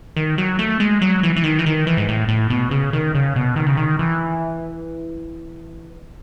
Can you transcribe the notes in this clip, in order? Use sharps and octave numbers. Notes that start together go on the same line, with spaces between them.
D#3
F#3
A3
G#3
F#3
E3
E3
D#3
E3
D#3
E3
G#2
A2
A2
B2
C#3
D#3
C#3
B2
D#3
C#3
D#3
E3